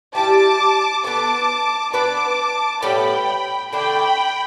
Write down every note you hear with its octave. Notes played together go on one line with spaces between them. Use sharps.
G3 E4 G4 A5 D6
B3 D4 A4 A5 D6
B3 D4 B4 A5 D6
A2 G3 B3 G5 B5
D3 A3 D4 G5 B5